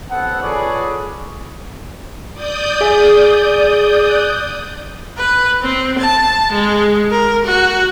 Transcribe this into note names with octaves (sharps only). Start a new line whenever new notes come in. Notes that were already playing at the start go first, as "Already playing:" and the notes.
A1 B3 C4 A4 F#5
F4 G#4 A4 B4 C#5 D5
D5 D#6 G6
G#4 E5 G#5
F#6
B4
C4
A5
G#3
A#4
F#4